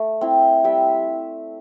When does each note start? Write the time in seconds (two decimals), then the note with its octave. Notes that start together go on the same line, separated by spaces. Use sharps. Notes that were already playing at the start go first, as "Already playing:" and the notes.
Already playing: A3
0.21 C4 E4
0.64 G3 E5 G5